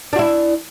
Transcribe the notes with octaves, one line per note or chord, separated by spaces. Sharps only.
D4 E4 F#4